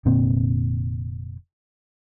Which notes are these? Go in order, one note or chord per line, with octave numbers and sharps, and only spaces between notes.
F1 A#2 D3 C4